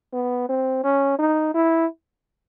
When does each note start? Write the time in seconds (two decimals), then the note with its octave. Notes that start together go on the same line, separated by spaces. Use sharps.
0.13 B3
0.49 C4
0.84 C#4
1.19 D#4
1.54 E4